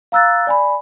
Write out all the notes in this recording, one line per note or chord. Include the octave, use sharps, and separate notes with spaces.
F5 A#5 E6 F#6 A6
D5 G#5 B5